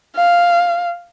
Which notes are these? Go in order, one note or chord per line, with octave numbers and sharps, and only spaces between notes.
F5